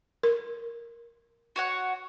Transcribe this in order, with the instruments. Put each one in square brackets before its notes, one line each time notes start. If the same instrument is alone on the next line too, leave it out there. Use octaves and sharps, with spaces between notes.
[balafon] A#4
[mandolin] F#4 C#5 F#5